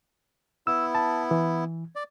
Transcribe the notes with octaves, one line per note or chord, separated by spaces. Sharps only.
B3 E4 E6
A5
E3
D5